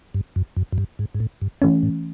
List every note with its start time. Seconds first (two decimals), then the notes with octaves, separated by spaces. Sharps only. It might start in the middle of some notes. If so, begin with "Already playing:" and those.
0.14 G2
0.36 F#2
0.56 F#2
0.72 F#2
0.78 G2
0.99 G#2
1.14 G#2
1.20 A2
1.41 G2
1.62 G#2 E3 A3 C#4
1.83 A2